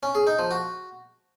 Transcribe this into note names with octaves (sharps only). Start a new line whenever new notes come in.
C#4
G#4
D#4
F3
F#4